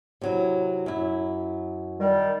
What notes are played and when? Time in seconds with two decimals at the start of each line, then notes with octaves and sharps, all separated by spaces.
0.21 C3 F#3 E4
0.86 F#2 E4
2.00 D#3 G3